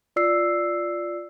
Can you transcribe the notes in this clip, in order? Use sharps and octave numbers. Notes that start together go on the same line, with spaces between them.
F4 D5 E6 C7